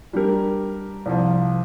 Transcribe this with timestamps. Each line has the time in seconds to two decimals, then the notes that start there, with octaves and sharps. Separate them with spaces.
0.13 G3 D4 G4 A#4
1.06 C2 C3 F3